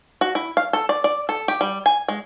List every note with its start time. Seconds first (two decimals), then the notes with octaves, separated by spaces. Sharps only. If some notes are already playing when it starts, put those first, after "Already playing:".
0.21 F#4
0.35 E4
0.57 F5
0.73 A4
0.89 D5
1.04 D5
1.29 A4
1.48 G4
1.61 G3
1.86 G#5
2.08 G#3